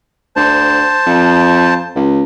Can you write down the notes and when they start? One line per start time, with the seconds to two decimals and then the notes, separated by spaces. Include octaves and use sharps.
0.36 D2 C5 A5
1.06 F2
1.96 C#2